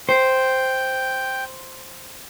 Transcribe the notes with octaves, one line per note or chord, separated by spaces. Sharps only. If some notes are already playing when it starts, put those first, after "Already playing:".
C5 G5